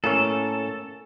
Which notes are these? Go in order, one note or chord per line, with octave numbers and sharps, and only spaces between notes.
A2 A#3 C#4 A4